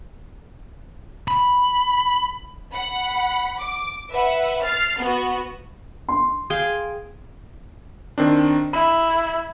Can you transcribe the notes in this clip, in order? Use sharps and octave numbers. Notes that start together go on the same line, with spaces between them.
B5
F#5 B5
D6
B4 E5 F#5
F6 A6 C7
B3 F#4
C6
G#4 F5 G5
D#3 C4 D4
E4 B5